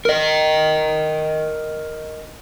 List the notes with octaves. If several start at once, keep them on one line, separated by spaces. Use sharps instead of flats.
A#4 D#5